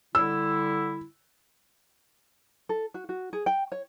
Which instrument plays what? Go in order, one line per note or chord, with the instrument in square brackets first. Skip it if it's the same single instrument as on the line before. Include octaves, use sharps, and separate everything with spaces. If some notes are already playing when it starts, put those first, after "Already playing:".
[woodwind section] D3 G3 E4 [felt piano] E6
[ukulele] A4
F#4
F#4
G#4
G5
C#5